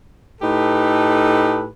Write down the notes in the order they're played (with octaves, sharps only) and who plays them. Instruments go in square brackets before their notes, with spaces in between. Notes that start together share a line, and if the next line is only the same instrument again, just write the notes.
[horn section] A2 D#4 G4 A4 B4